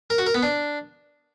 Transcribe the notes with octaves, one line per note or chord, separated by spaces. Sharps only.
A#4
F#4
A#4
B3
D4